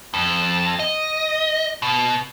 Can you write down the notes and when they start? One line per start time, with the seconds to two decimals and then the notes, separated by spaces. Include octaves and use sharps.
0.14 F2
0.79 D#5
1.82 B2